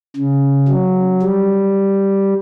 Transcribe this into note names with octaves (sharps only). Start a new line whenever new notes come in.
C#3
F#3
G3